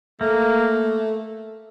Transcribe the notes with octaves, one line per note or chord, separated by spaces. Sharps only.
A3 A#3